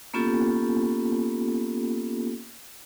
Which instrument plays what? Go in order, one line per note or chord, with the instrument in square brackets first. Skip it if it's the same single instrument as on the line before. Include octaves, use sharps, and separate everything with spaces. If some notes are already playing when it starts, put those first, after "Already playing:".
[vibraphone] A#3 B3 C#4 F4 G4 A4